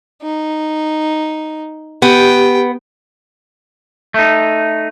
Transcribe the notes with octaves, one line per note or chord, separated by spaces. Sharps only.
D#4
B3 G4 G5
A3 D#4